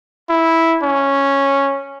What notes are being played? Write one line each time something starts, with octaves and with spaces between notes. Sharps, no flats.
E4
C#4